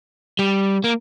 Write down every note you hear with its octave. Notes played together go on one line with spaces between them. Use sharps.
G3
A#3